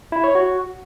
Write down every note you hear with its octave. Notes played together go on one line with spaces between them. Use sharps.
E4
C#5
F#4